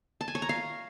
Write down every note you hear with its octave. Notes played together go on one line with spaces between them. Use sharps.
A5
G#5
C#5
A#5
F5